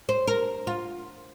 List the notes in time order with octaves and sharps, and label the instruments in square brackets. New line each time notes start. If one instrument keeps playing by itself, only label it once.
[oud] C5
A#4
F4